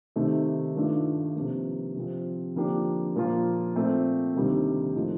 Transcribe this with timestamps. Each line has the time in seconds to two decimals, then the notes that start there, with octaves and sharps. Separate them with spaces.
0.16 C3 D#3 A3
0.76 G2 D#3 A3 D4 F4
1.36 C3 F3 A#3
1.95 C3 F3 C4
2.56 D3 F3 A#3 D4 G4
3.15 A#2 F3 A#3 F4
3.76 A#2 A3 C4
4.36 D2 C3 D#3 G3 A#3
4.95 A2 F3 A3 D#4